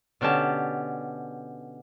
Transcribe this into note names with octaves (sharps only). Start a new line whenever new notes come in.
B2 D3 C#4 G4 A5